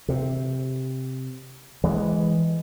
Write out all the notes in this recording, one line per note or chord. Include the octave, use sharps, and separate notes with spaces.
C3
E3 G#3